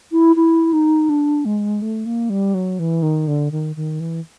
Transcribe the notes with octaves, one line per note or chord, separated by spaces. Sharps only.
E4
E4
D#4
D4
G#3
A3
A#3
G3
F#3
E3
D#3
D3
D#3
D#3
E3